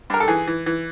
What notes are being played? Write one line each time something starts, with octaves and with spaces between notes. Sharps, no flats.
G2 A#4
A4
E3 G#4
E3
E3